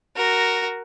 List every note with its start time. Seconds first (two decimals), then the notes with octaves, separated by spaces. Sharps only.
0.16 F#4 A#4